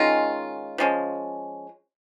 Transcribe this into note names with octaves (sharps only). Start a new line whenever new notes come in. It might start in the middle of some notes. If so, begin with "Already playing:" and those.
Already playing: D#3 G#3 C#4 F4
F3 G#3 C#4